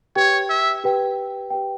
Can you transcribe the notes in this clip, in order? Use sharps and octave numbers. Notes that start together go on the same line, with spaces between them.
G4 B4 C#5 G5
E5
G4 B4 G5
G4 B4 G5